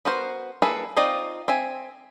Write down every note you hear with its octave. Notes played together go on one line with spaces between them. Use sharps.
B3 F#4 A#4 C5
A#3 E4 G#4 A4 B4
C4 D#4 F4 D5 D#5
C4 E5 G#5